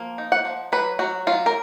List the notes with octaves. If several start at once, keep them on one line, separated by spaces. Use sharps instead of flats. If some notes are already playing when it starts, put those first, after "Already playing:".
Already playing: F3 A#3
D#4
F#5
F3
F#3 B4
F#3 F#4
F#3 F4
A#4